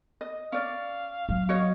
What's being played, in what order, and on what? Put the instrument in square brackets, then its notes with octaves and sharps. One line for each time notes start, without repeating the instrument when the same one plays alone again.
[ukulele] D#5
[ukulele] C#4 D5 [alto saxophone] F5
[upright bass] F#3
[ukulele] F#4 C#5 D#5